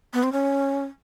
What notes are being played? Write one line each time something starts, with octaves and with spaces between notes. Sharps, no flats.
B3
C4
C#4